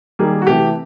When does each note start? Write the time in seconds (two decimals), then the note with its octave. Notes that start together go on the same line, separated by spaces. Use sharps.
0.19 D#3 G3 A#3 G#4
0.42 F#4
0.47 C3 E3 A3 G4